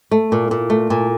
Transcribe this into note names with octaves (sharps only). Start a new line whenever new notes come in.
A3
A#2
A#2
A3
A#2